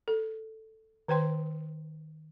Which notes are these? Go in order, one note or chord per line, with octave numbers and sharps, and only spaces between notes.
A4
D#3 B4 C5 G5 C6